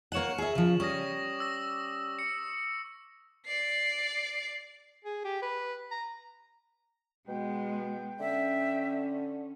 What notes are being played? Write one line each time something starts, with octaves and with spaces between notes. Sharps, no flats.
A#3 C#5 F#5 C#6 E7 F#7
G#4 E5
C#3 F3
G3 C#4 C#6 D#6 A#6
D6 E6 A#6
C#7
D5 C7
G#4
G4
B4
A#5
B2 G#3 B3 G5
D3 C#4 E5